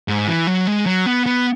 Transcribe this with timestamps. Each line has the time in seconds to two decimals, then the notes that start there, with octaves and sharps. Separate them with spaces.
0.08 G#2
0.28 E3
0.47 F#3
0.67 G#3
0.86 F#3
1.06 B3
1.26 B3